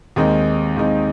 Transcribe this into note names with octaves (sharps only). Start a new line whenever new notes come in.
D#2 D#3 G#3 C4 D#4
D#2 D#3 G#3 C4 D#4